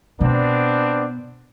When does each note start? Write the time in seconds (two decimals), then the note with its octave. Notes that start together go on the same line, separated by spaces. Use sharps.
0.20 B2 B3 C4 D4